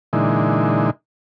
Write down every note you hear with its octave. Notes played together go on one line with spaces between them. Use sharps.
A#2 D3 E3 G#3 D#4